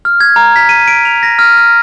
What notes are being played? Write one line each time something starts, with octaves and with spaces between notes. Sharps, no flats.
F6
G#6
A#5
B6
D#7
D7
F7
A#6
F6
F6